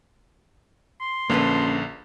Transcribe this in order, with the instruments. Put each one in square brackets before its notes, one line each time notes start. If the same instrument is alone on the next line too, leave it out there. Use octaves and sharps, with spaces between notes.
[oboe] C6
[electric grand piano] A#1 D3 A5 [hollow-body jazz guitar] A#3 C#4 B4